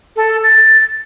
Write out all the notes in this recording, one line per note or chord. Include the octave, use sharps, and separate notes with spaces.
A4
A6